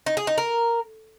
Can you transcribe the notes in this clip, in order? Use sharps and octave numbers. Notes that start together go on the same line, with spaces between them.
D#4
G#4
D#4
A#4